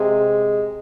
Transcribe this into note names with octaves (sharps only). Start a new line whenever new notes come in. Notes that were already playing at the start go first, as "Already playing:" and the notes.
Already playing: C3 G#3